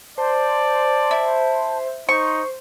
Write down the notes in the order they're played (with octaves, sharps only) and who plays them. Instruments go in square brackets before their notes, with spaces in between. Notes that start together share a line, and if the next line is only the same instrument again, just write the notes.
[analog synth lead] C5 [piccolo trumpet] D5 [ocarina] A5
[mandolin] E4
[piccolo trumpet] D#4 [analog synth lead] C5 [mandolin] C#6